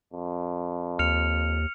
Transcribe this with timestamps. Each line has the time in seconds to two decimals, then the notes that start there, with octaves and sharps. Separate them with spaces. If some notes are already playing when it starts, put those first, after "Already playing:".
0.13 F2
0.99 D#2 F6 C#7 F7